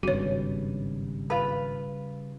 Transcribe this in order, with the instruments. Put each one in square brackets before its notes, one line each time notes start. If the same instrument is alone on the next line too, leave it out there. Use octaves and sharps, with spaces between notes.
[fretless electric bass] G#1 G2 [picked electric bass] C#3 G3 [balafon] F#4 C#5
[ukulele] F4 B4